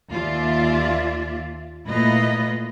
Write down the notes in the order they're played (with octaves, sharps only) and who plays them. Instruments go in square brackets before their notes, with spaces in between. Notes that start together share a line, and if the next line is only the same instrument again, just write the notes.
[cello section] D#2 F4 D5 E5
A#2 A3 E4 F4 B4 D#5